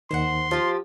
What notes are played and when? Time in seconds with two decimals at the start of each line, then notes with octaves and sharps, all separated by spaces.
0.11 D#2 D#3 C5 C#5 F#5 C6
0.51 F3 F4 G4